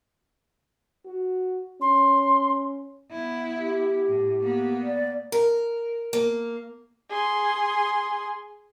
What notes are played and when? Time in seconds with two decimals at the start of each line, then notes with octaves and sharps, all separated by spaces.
1.05 F#4
1.81 C#4 C6
3.11 B3 E4
3.56 G4
4.08 A2
4.40 A#3 B3
4.83 D5
5.32 A#4
6.13 A#3
7.09 G#4 C6